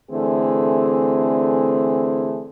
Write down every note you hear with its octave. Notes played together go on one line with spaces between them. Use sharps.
D3 E3 A3 C4 G#4